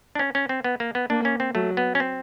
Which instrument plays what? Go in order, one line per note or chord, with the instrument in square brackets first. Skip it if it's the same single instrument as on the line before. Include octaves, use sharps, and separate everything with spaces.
[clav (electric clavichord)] D4
C#4
C#4
C4
B3
A#3
B3
[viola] A#3 [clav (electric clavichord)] D4
[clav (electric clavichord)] C#4
C4
[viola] F#3 [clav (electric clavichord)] A3
[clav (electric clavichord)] B3
C#4
C4